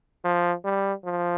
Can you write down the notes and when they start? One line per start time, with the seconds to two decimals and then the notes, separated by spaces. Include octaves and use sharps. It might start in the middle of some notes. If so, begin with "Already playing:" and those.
0.24 F3
0.65 G3
1.05 F3